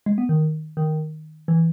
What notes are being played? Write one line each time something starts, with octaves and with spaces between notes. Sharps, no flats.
G#3
B3
D#3
D#3
E3